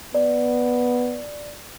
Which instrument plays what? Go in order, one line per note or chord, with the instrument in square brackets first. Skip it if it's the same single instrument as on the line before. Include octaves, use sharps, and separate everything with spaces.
[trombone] B3 [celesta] D5